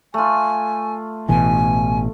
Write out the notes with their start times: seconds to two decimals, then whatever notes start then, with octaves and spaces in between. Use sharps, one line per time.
0.14 A3 F4 G#5
1.29 A1 B2 E3 G#5